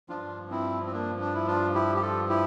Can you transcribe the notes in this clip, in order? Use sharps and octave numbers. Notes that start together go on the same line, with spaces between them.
G2 F3 D4 F4
C4 E4
C4
A#3 D4
D4
E4
D4 F4
E4 G4
G4
F4 A4
E4 G4